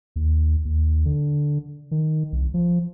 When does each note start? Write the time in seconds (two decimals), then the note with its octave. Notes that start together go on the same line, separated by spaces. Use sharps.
0.16 D#2
0.65 D#2
1.05 D3
1.91 D#3
2.32 C2
2.54 F3